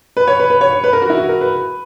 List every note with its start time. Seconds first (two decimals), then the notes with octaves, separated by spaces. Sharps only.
0.17 B4
0.28 C#5
0.40 B4
0.50 B4
0.61 C#5
0.73 C#5
0.84 B4
0.93 A#4
1.02 F#4
1.10 E4
1.18 F#4
1.29 A#4
1.41 B4